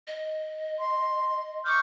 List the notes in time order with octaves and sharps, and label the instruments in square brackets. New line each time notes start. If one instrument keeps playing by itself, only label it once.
[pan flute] D#5
[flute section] C6
[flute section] C#6 F6 G6 [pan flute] D6